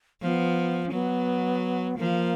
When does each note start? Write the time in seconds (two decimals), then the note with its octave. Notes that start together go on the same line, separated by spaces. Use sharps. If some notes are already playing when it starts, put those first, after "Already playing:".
0.22 F3 B3
0.86 C#4
0.92 F#3 B3
1.98 F3 A#3